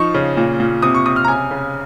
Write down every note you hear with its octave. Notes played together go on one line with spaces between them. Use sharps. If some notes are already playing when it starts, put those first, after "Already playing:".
Already playing: F3 D#4 C#6
C#3
A#2
A#2
C3 D#6
C#6
C3 D#6
F6
A#5
C#3 G#5
C#3